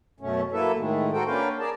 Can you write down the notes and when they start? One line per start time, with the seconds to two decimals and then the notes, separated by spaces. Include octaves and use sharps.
0.20 F#2 B2 A3 C#4
0.52 F#3 A#3 E4 A4 B4 E5
0.76 A2 D#3 G#3 A3
1.13 F#4 A4 A#4 C5 G5
1.27 A#3 C#4 D4 B4 F5 G5
1.59 G#4 A#4 D5 A5